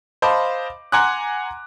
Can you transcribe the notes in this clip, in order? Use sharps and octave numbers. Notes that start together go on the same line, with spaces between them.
C5 D#5 F5 A5 B5 D6
F#5 G#5 A#5 C6 D6 F#6